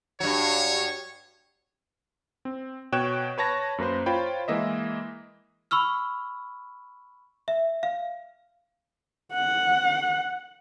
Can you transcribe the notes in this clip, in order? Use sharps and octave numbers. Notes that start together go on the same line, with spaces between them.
G2 F#3 C#5
C4
B2 C#5 G5 F#6 E7
B4 C#5 A5 A#6
F#2 A#3 B4 C5
F4 C5 C#5 G5 B5
E3 G#3 A#3 D#5 E5
B5 C#6 E6 F6
E5
F5
F#5